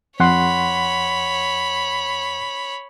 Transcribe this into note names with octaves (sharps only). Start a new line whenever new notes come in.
F2 C#5 F#5 B5 C6